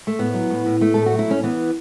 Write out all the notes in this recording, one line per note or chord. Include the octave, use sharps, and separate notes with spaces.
A3
A2 B3
F#3
A2
A2
A2 A3
A2 A4
F#4
F#3
E4
A2 C#4
E3 B3